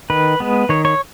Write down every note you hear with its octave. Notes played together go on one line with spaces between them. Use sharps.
D#3 B4
G#3 B3
D#3 C#5
C#5